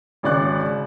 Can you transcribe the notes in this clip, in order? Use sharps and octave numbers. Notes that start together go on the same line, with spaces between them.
G#1 C#3 D5 F#6